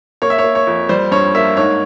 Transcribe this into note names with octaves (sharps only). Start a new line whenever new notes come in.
A#3 C#5
E5
C#5
A#3
C#5
F2
G3 C5
G2 C#5
A#3 E5
G#2 C#5